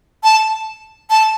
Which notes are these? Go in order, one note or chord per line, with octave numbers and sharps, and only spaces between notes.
A5
A5